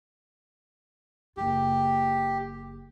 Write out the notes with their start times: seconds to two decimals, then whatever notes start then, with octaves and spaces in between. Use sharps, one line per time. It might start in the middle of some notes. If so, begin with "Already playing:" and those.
1.37 F#1 F4 G4